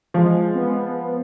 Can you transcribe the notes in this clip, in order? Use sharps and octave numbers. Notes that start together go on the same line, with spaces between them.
F3 G#3
B3